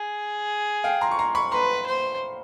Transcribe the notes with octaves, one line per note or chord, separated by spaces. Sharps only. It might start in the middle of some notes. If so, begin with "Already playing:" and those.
Already playing: G#4
F5 G5
A#5 C6
C#6
A#5 C6
B5 C#6
B4 A#5 C6
C5